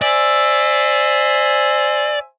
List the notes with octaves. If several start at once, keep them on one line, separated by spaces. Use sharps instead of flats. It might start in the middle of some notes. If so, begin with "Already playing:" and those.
C5 D5 E5 G#5